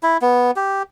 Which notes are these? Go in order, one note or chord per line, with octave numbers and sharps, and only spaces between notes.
E4
B3
G4